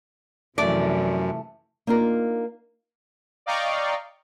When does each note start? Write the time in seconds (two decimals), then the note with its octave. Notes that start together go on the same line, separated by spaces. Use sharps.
0.58 F#2 C3 E3 F3 A3 D5
1.87 A#3 D4 D#4 F4 A#4
3.46 D5 D#5 F5 G5 A#5 C#6